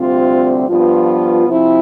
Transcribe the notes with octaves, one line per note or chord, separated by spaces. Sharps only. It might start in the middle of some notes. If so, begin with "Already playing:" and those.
Already playing: D2 C3 G3 C4 F4
G2 F3 B3 F4
C3 F3 C4 E4